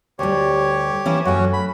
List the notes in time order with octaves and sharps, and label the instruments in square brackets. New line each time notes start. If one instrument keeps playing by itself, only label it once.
[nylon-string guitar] D2 G3 [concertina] G4 C#5
[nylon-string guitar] E3 C#4 E4
[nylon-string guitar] F#2 A3 [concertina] C#4 F#4
[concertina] B5